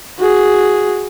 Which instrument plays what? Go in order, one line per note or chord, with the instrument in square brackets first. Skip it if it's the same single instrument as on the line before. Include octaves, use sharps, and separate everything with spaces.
[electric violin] F#4 G#4